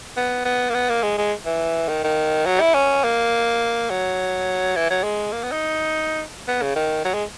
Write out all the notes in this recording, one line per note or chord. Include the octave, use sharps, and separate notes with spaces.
B3
B3
A#3
B3
A#3
G#3
G#3
E3
D#3
D#3
F#3
E4
C#4
A#3
F#3
E3
F#3
G#3
A#3
B3
D#4
B3
C#3
D#3
F#3
G#3